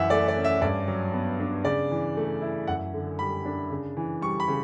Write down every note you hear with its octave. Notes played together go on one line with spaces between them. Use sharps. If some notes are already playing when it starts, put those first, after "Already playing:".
Already playing: F#2 E3 E5 F#5
A3 D5
D5
C#4
E5
G2 D5
F#3
B3
D4
C#3 D5
E3
A3
E4
F#2 F#5
D3
G3 B5
D4
C#3
E3
G3 C#6
B5
C#3